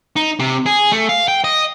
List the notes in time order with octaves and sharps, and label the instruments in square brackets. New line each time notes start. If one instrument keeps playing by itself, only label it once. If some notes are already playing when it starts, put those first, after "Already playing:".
[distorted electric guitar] D#4
C3
G#4
A3
F5
G5
D#5